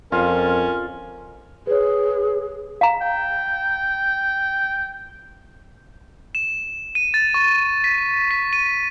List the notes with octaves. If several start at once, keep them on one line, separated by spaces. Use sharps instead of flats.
F2 C#4 F4 A#4
G#4 B4 C#5
F5 A#5
G5
E7
D#7
A6
C#6
B6
B6
D#7